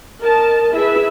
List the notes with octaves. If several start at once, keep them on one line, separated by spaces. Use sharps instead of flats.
A#4 D#5 A5
E4 G#4 B4 E5